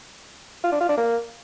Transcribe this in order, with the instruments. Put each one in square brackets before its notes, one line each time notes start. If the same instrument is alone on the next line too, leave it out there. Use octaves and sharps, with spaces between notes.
[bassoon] F4
D4
F4
D4
A#3